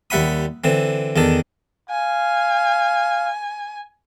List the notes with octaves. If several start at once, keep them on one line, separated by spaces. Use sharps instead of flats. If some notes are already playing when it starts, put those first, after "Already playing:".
D#2 G3 E5 F#5 B5 D#6
D3 E3 C4
E2 D#3 D4 A4
F5 G#5